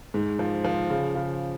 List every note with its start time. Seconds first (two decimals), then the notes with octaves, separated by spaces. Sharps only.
0.14 G#2
0.39 F3
0.64 F3
0.90 C#3
1.15 C#3